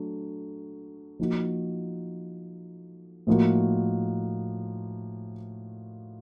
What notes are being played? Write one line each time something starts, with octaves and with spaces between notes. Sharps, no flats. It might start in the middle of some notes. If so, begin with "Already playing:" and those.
Already playing: F#3 A3 D4
F3 A#3 D#4 F#4
A2 F3 A#3 D#4 F#4